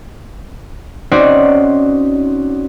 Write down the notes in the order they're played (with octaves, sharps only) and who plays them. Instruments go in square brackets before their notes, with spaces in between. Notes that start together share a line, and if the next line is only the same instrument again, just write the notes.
[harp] C4 C#4 D#4 F#4 C5 D5